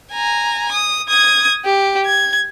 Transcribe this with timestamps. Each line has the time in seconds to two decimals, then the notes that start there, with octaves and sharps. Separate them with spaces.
0.13 G#5 A#5
0.71 D#6
1.09 D#6 G#6
1.65 G4
2.06 G#6